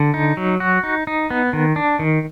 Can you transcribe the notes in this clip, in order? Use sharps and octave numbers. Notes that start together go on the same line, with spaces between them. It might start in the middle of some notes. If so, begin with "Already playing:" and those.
Already playing: D3
D#4
F#3
F#4
D#4
D#4
B3
D#3
D4
D#3